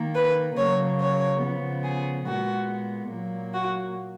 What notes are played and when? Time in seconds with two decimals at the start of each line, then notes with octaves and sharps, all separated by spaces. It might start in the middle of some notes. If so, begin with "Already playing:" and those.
Already playing: D#3 A#3
0.15 B4
0.57 C#3 F#3 A#3 C#5
1.00 C#5
1.42 C#3 F3 B3
1.84 G#4
2.26 A#2 G#3 B3 F#4
3.10 A#2 F#3 A#3
3.54 F#4